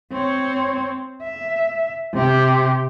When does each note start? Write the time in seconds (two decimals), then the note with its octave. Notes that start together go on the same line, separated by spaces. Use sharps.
0.12 C4 C#5
1.24 E5
2.14 C3 G4